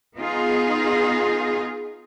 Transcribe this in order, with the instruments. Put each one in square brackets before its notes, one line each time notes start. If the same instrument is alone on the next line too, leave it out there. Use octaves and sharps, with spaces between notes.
[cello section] B3 D#4 F4 G#4